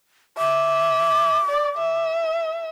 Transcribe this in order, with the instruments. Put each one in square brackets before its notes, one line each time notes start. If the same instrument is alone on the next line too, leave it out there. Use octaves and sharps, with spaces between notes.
[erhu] E5 [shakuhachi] D6
[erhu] D5
E5